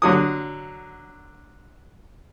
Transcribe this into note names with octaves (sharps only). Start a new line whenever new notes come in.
D3 F#3 D#6